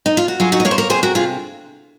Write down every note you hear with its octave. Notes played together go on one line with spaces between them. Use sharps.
D#4
F4
F#4
F#3 F4 G#4
D#4 F#4
D#5
A#3 C#5 F5
C5
A#4 C#5
C3 G#4 C5
F#4 A#4
C3 F4 G#4